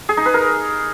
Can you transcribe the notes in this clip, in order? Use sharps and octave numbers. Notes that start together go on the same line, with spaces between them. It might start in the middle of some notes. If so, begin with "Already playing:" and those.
G#4
D#4
B4
A#4